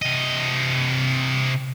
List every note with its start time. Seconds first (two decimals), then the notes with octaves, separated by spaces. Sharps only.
0.02 C3 D#5